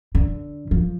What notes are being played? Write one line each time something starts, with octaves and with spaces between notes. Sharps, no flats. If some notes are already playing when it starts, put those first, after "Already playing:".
D3
F3